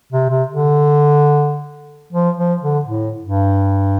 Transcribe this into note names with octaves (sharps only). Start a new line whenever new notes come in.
C3
C3
D3
F3
F3
D3
A2
G2